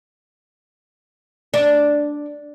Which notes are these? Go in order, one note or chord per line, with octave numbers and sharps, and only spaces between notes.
D4